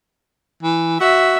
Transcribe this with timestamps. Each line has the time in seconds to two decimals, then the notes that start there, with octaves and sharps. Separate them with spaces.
0.63 E3
1.00 F#4 E5